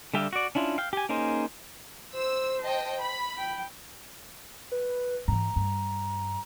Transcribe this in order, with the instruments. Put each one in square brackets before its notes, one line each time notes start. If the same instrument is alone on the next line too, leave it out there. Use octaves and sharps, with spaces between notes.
[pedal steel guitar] D3 G3 G4 E5 F5
F#4 D5
C#4 D4 E4 F4
F5 G5
G4 G#5
A#3 C#4 D#4 G#4 C5
[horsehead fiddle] C5 [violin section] E6
[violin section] D#5 G5 A5
B5
[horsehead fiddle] G5
[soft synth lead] B4
[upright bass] G#2 E3 [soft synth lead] A#5
[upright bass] G2